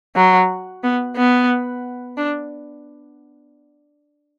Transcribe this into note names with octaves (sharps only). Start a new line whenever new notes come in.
F#3
B3
B3
D4